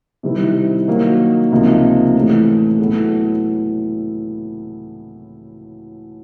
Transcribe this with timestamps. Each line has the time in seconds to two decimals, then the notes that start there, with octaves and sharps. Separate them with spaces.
0.23 C3 D#3 G3 C4 E4
0.88 D#3 F#3 A#3
1.51 C#2 C3 F3 A#3 D#4
2.15 A2 E3 A3
2.79 A2 F#3 B3 E4 A4